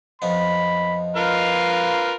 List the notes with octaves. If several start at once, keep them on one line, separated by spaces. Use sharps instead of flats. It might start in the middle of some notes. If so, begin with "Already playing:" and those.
F2 F3 B3 D#5 B5
F4 A#4 B4 F5